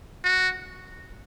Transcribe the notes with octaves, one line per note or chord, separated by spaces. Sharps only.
F#4